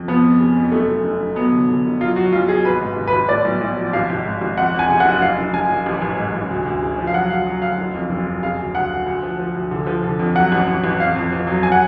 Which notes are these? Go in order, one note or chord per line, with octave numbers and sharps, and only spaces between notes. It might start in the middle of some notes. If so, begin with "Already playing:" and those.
Already playing: F2
F3 B3
F2
C#3
F2
F#1 A3
F#1
F#1
F#1
F#3 B3
D3
D3
F#1
F#3 F4
F#3 F#4
B1 F4
B1 G#4
G#1 B4
G#2
G#1
B4
G#1
A2 D5
B1
B1
F3
G#1 F5
G#1
G#2
G#1
F2 F#5
F2
G#5
C#3
F#5
F#1
F#1 F5
F#1
F#1 G#5
F#1
A1
A1
G#2
A1
D2
D2
C#3
F3
F5
F#3 F#5
D2 F5
F#3
D2 F5
F#1
F2
F#1
F2
C#3 F5
D2
D2 F#5
D2
D2
F3
F3
D2
D3
F3
D3
F2
F#3 F#5
A1
A1
A1
F2 F5
F2
F2
F#3
G#5
F#5